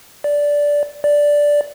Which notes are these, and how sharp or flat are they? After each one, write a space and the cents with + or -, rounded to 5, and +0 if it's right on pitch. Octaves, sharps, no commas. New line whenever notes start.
D5 -10
D5 -5